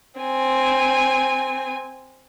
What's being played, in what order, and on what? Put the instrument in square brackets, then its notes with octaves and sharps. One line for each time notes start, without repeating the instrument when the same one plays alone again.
[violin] C4 G#5